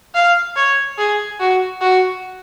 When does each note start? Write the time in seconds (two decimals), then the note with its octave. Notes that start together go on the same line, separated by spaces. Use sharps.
0.15 F5
0.56 C#5
0.98 G#4
1.40 F#4
1.81 F#4